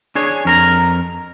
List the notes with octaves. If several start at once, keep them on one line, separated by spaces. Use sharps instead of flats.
D4 G#4 C#5
F2 A#4 A#5